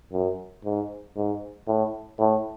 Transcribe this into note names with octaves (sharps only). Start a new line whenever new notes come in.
F#2
G#2
G#2
A2
A2